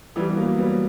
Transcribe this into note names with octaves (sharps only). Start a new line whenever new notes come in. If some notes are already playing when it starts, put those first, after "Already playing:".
E3 G3
B3
F#3 A#3
G3 B3